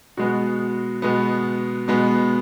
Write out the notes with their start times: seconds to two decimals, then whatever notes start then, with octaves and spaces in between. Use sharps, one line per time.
0.17 B2 G#3 B3 F#4
1.02 B2 G#3 B3
1.88 B2 G#3 B3